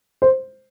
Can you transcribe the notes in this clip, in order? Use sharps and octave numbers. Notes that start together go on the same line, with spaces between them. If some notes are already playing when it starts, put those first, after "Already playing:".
C5